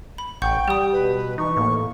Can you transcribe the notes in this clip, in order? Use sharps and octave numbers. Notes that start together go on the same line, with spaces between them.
B5
A1 F#5 G5 C#6 G6
G3 G4 D#6
B2 B4
E3 D#4 C#6
A2 A#3